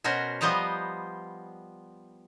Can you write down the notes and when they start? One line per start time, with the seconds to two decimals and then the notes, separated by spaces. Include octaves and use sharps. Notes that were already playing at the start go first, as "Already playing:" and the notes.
0.04 B2 C#4 F#4 A#4 C5
0.41 F3 G3 B3 C5 D#5 A#5